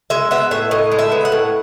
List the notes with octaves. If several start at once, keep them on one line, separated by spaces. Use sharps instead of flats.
G#3 E5
B3 E5
A2 E5
A2 D#5
G#3
E5
B3
F#5
A2